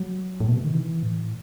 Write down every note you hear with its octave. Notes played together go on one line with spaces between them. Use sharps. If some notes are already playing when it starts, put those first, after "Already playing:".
Already playing: F#3
A2
B2
C3
D#3
E3
A2